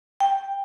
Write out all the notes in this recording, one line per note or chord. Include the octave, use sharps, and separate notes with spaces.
G5